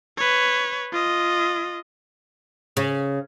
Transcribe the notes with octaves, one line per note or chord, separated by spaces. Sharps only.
B4 C#5
F4 D#5
C#3